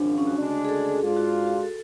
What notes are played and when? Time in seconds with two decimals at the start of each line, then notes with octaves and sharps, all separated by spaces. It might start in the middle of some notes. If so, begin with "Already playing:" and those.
Already playing: G#1 F#2 C#3 F3 D4
0.18 C#4
0.27 F#4
0.38 D2 C#3 G#3 D4
0.65 G#4
0.69 A4
0.85 A4
1.01 G#2 G#3 D4 F4 G#4
1.16 F#4
1.47 F#4
1.63 A4